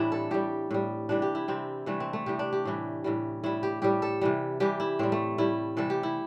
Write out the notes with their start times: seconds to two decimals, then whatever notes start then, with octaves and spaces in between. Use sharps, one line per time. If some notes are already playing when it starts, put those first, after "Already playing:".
Already playing: A2 E3 G3 A3 C4 D4 E4
0.12 A4
0.31 A2 G3 G4
0.71 A2 G3
1.09 C3 E3 G3 D4
1.22 G4
1.35 E4
1.48 C3 E3 G3 C4
1.86 C3 E3 G3 A3
2.00 C4
2.13 A3
2.26 C3 E3 G3 G4
2.39 D4
2.53 G4
2.65 A2 E3 G3
3.04 A2 E3 G3
3.44 A2 G3 E4
3.63 G4
3.82 A2 G3 G4
4.02 A4
4.21 C3 E3 G3
4.60 C3 E3 G3 G4
4.80 E4
4.99 A2 G3 C4
5.12 A3
5.38 A2 G3 E4
5.77 C3 E3 G3 A4
5.90 G4
6.03 E4